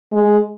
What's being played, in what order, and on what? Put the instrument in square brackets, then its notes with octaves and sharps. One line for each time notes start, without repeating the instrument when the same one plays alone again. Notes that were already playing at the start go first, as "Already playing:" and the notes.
[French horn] G#3